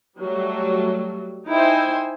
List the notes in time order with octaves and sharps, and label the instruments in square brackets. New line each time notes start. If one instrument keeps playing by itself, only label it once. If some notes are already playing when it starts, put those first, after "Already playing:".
[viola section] F#3 G3 A3
D#4 E4 C5 G5 G#5